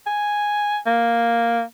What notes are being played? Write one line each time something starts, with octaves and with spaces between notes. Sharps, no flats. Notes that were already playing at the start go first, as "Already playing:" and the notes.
G#5
A#3